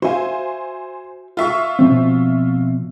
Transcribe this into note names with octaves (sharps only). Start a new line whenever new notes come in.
F#4 C5 E5 F5 G#5
F4 E5 C#6
B2 F3 C4